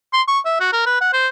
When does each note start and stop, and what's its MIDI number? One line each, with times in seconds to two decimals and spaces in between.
0.13 0.22 84
0.28 0.39 85
0.45 0.57 76
0.60 0.68 66
0.73 0.86 70
0.86 1.00 71
1.01 1.09 78
1.13 1.28 72